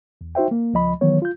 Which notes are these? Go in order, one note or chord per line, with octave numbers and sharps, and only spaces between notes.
E2
D#4 F#4 C5 E5 G5
A#3
C#2 F3 D#5 B5
D#3 E3 F#3 B3 C#5
F4 G6